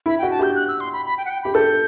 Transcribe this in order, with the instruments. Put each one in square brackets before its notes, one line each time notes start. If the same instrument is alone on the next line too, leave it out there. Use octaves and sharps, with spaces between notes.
[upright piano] E4 [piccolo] B5
[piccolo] G5
[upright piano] F#4
[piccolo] A5
[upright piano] G4 [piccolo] G6
[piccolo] F#6
E6
C6
B5
B5
G5
F#5
G5
[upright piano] G4 [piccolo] B5
[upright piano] A4 [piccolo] G6